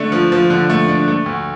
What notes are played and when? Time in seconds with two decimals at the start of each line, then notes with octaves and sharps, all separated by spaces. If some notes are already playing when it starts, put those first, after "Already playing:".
Already playing: D3 A3 D4
0.12 F3
0.32 F3
0.50 D3
0.70 A3
0.88 D4
1.08 A3
1.26 D2